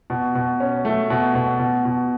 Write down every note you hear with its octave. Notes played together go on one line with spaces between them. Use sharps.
B2
B2
C#4
A3
B2
B2
B2
B2